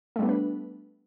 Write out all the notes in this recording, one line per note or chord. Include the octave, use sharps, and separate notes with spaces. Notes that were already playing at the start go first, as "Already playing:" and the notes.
G3 A3 B3 D4 B4